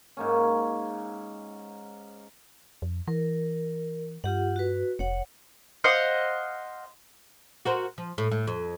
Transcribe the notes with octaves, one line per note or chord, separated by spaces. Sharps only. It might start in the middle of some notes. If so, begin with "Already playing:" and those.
G#2 A#3 C#4
F2
E3 A#4
G2 F4 G4 F#5
F#4 B4
F1 C#5 F#5
C5 D#5 F5 F#5
F#4 A#4 C5
F3
A2
A2
F2